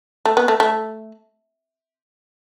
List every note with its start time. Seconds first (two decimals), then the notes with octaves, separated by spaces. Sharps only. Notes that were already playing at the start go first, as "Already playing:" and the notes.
0.25 A3
0.37 B3
0.48 A3
0.60 A3